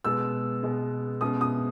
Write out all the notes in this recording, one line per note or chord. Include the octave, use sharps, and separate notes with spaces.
B2 G#3 B3 E6
B2 G#3 B3
B2 G#3 C#4 D#6
D#6